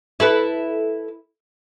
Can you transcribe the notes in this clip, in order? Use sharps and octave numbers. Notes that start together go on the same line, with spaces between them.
E4 A4 B4